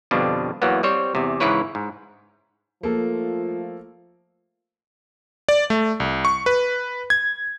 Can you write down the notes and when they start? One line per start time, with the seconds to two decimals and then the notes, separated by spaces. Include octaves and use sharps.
0.11 F2 B2 D3 F3 G3 D4
0.62 E2 E3 F#3 A#3 B3
0.83 G3 C4 C5 C#5
1.15 E2 C3
1.40 G#2 C#3 E3 E4 B4 C#5
1.75 G#2
2.83 F3 A3 A#3 F4 A4
5.49 D5
5.70 A3
6.00 C2
6.25 C#6
6.46 B4
7.10 G#6